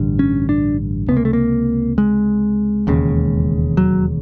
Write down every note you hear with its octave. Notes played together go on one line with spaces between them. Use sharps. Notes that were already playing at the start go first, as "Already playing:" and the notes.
Already playing: A1 G2 D3
C#4
D4
C#2 C3 B3
A#3
A3
A#3
G#3
E1 D#2 C#3
F#3